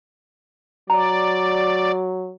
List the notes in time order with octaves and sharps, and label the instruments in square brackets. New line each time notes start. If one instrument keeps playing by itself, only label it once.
[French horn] F#3 [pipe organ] D5 [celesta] A#5